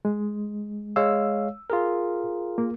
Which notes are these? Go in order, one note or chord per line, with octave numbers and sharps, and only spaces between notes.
G#3
G#3 C#5 F5 E6
F4 G#4 A#4
A#3